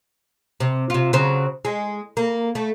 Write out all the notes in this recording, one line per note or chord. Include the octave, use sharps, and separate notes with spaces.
C3
C3 F4
C#3 F#3 C4
G#3
A#3
A3